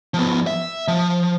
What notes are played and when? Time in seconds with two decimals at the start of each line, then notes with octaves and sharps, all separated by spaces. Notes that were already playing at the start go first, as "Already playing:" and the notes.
0.14 F3 B3
0.47 E5
0.88 F3